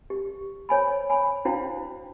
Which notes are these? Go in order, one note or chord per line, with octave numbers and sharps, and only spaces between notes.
G4
C5 C#5 G#5 B5
G#5 B5
D4 E4 F#4 C5 F5 G5